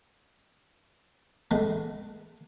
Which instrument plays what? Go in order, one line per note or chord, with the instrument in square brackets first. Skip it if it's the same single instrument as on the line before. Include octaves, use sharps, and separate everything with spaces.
[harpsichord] G#3 A3 B3